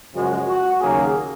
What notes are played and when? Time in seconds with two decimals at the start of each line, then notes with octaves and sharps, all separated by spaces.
0.13 F#2 C#3 F3 G#3 F#4
0.48 F#4
0.81 D#2 C#3 F#3 A#3 G#4